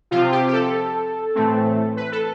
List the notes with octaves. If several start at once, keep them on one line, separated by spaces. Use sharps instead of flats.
C3 F3 C4 F4
G4
G4
A4
A2 E3 A3 C4
B4
A4